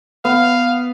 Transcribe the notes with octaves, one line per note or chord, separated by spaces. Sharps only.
B3 F5